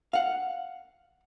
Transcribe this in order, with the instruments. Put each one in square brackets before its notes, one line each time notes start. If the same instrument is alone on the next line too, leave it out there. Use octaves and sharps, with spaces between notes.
[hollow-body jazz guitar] F5 F#5